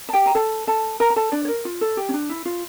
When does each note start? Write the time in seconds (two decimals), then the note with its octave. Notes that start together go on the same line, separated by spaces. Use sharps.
0.09 A5
0.13 G4 G5
0.26 A#5
0.35 A4 A5
0.67 A4 A5
1.00 A#4 A#5
1.10 A#5
1.16 A4 A5
1.32 D4 D5
1.45 C#5
1.48 A#4
1.65 F4
1.81 A4
1.97 G4
2.09 C#4
2.14 D4
2.29 E4
2.45 F4